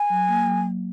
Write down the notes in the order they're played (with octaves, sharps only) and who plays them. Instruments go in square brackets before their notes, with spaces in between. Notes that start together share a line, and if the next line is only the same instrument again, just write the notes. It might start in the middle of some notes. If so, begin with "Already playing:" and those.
Already playing: [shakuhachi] G#5
[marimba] F#3
A#3
F#3